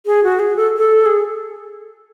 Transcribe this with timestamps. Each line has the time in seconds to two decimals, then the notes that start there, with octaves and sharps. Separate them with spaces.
0.06 G#4
0.24 F#4
0.39 G#4
0.56 A4
0.77 A4
1.06 G#4